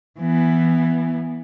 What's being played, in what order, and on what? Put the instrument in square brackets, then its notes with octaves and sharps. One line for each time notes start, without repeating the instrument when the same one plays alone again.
[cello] E3 B3